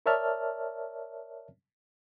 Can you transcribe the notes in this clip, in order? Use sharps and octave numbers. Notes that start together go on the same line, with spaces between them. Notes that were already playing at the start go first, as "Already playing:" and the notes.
A#4 C#5 D5 E5 A5 F6